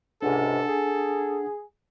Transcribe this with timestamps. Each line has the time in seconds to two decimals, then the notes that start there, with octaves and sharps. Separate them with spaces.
0.22 C#2 G#2 C3 D4 A4 F#5 G#5
0.69 G#4